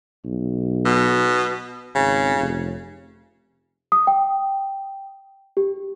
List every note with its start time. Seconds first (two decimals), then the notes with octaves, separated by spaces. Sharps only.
0.25 B1
0.85 B2
1.95 G#1 C#3
2.36 F1
3.92 D#6
4.07 G5
5.57 G4